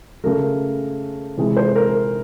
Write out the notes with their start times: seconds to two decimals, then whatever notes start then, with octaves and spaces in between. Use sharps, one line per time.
0.24 C#3 F#3 A3 A#4
1.37 C3 E3 G#3
1.57 C5
1.75 A#4